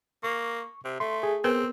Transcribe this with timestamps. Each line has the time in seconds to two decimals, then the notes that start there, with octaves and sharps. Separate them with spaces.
0.23 A#3 C#6
0.85 C3
1.00 A3 C6
1.23 G#4
1.44 B3 C4 A#4 B4